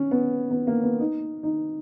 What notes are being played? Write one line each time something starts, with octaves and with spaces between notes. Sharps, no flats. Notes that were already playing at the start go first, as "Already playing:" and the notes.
Already playing: C#4
B3
B3
A#3
B3
D#4
D#4